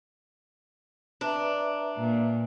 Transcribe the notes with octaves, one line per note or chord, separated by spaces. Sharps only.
D4 B4 E5 A#5
A#2